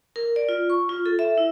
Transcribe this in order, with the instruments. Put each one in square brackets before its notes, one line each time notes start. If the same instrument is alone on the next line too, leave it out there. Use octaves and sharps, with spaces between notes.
[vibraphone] A#4
D5
F4
C#6
F4
A4
E5
E4